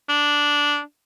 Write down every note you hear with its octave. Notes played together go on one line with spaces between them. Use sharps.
D4